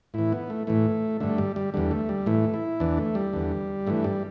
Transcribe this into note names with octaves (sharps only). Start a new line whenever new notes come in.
A2 E3 E4
B3
A3
A2 E3 A3
G2 D3 A3
G3
G3
E2 D3 G3
A3
G3
A2 E3 A3
E4
E2 E3 D4
A3
G3
E2 D3
G2 E3 A3
G3